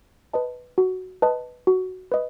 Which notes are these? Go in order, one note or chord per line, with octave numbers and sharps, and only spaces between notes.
B4 D#5 A5
F#4
B4 D#5 A5
F#4
B4 D#5